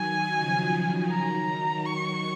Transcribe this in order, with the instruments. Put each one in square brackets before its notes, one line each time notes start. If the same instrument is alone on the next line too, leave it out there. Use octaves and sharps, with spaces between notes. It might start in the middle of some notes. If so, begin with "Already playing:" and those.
Already playing: [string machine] D#3 F#3 [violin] G#5
[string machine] C#3 F3
[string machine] D#3 F#3 [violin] A#5
[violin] C#6